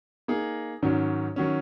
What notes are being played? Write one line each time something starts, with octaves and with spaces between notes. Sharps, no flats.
A#3 D#4 G#4
G#2 D#3 F#3 C#4
D#3 F#3 C#4